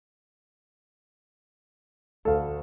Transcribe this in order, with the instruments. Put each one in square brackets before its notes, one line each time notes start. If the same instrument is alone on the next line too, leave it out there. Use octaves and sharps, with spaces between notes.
[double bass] D2 [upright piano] A4 F5